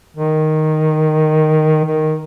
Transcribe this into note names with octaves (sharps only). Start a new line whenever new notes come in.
D#3
D#3